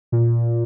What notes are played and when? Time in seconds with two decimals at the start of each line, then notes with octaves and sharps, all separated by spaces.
0.12 A#2